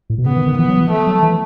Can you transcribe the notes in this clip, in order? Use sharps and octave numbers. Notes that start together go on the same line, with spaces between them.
A2
B2
C#3 B3
D#3
D#3
E3 B3
F#3
E3
A3
F#3
E3